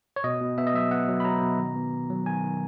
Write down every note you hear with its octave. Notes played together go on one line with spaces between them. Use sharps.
C#5
B2 D#5
B2
B3 E5
D#5
F#3 E5
B3 F#5
F#3
B5
F#3 A#5
B2
D#3
B3
D#3
F#3
D#3 G#5
D#3